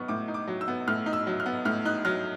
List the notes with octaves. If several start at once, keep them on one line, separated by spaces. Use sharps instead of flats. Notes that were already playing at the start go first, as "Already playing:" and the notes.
Already playing: F#3 B3 D#4 C#6 F6
A2 D6
D#4
D6
F#3
E6
B3
A2 F6
D#4
E6
F#3
F6
B3
A2 F6
D#4 F#6
F#3 F6